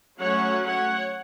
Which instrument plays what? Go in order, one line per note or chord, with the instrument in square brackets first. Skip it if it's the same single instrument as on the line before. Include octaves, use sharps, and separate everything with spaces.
[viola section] F#3 A3 C#4 C#5 F#5
C#5 F#5